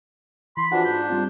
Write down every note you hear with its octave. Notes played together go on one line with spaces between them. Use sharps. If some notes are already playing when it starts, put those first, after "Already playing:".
E3 B5 C6
E3 F3 D4 F4 F#4 G#4 F#5
G#2 D4 G6
G3 C4 F4